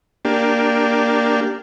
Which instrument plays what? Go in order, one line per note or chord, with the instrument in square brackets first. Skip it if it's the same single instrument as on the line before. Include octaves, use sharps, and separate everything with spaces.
[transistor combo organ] A#3 D4 G4